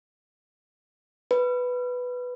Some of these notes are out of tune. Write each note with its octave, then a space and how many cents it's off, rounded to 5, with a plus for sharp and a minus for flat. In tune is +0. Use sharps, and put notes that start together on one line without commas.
B4 +5